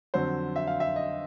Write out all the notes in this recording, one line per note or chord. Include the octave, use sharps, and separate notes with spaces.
F2 D3 F#3 C5
E5
F5
E5
D#5